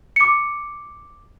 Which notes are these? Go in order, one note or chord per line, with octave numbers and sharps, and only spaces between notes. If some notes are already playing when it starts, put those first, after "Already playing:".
D6 C#7